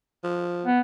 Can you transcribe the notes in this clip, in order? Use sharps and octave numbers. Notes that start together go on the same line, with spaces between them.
F3
B3